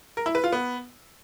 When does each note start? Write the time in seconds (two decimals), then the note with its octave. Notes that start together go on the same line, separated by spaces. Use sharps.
0.17 A#4
0.26 E4
0.35 B4
0.44 F4
0.52 B3